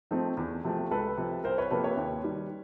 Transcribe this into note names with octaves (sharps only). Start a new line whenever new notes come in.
F3 A3 C4 D#4
E2
C3 F3 A3
C#2 A4 B4
C3 F3
C2 A#4 C5
B4 C#5
C3 F3 A#3 A4 B4
B4 C#5
D#2
D#3 G3